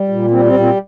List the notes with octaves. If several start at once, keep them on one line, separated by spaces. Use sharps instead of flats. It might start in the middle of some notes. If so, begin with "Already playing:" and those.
Already playing: G3
A#2
G3 C4
C4
A#2
C4